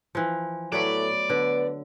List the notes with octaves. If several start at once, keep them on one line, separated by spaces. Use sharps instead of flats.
E3 F3
A2 F#3 A3 B3 D5
D3 B3